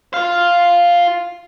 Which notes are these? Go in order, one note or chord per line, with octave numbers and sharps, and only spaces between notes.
F4 F5